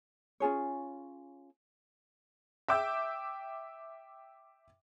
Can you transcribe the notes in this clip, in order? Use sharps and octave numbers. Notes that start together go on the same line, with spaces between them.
C#4 F4 G#4 C#5
E5 G5 D6 E6 G6